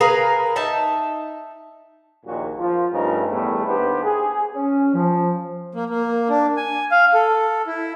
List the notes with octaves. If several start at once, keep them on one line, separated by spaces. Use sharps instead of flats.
G#4 A#4 B4 F5
D#4 E5 A5
A#1 D#2 A#2 D#3 F#4
F3
G2 C#3 F3 A3 D#4 A#4
E2 A2 G3 A3 B3 E4
D#2 B3 D4 G4 B4 C5
G#4
C#4
F3
A#3
A#3
D4
G#5
F5
A4
E4